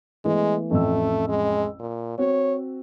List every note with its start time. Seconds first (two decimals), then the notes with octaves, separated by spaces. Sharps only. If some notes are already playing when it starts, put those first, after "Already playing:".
0.25 E3 G#3 A3 B3
0.71 A1 F2 A3 E6
1.29 G#3
1.79 A#2
2.18 C4 F#4 C#5